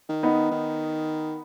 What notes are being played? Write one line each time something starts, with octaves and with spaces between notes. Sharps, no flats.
D#3
B3 D#4
D#3